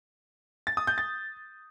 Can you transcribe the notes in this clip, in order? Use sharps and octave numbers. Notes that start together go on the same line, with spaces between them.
A6
D#6
G6
A6